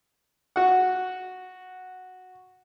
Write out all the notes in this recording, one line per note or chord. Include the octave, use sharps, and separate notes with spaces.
F#4 F#5